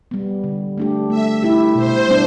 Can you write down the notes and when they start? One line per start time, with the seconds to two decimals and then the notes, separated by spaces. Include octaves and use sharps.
0.11 G3 B3
0.44 D3
0.78 A3 D4 G4
1.10 A3 E5
1.43 E4 G4
1.75 B2 C5
2.08 G3 B3 D4